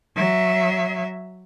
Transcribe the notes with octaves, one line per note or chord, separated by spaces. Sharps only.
F#3 E5